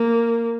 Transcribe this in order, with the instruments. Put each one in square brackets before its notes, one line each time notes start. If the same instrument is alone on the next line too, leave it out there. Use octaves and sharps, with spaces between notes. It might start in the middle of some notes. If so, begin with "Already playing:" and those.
Already playing: [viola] A#3